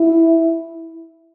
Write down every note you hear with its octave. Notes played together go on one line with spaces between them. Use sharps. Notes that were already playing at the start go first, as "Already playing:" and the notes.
Already playing: E4